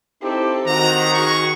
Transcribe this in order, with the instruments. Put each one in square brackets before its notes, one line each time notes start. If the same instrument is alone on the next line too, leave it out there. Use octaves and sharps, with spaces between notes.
[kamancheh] C4 A4 [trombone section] D#4 E4 G4
[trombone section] D#3 [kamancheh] C4 F#4 [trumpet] A#5
[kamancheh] F#4 G#4 [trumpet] C#6